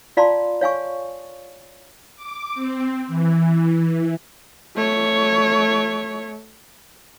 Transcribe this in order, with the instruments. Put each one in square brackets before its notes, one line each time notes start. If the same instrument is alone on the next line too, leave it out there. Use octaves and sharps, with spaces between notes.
[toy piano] F4 D5 F5 A5 A#5 C6
C#5 F5 G#5 C#6
[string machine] D6
C4
E3
[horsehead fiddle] A3 C#5